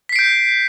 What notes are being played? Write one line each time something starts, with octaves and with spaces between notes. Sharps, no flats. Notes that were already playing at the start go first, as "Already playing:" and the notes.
G6 B6 C7 D7